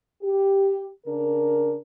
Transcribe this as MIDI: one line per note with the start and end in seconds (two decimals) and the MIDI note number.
0.22 0.88 67
1.06 1.76 49
1.06 1.76 62
1.06 1.76 70